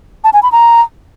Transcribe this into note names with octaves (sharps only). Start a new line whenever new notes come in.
A5
G#5
B5
A#5